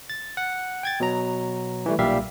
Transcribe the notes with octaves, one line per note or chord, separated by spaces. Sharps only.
A6
F#5
G5 G#6 A6
B2 F#3 A#5
E3 G3 A3
B1 A#2 G3 G4 E5 F5